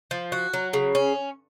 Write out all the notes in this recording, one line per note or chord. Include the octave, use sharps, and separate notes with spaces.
F3
F#4
F#3
C#3
C#4